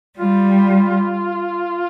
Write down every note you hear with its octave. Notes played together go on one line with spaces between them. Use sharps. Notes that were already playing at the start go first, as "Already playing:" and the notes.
G3 F4